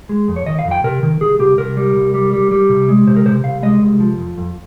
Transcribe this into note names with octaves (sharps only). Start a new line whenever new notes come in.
G#3
F2
C#5
D#3 D#5
F5
F2
G5
C3 A#4
D#3
C2 G#4
C2 G4
C2 A#4
G3
C2
G3
G3
G3
C3
G#3
C3 C5
A#4
C3 C5
C2 F5
G#3 D#5
C2
F3
F2
F2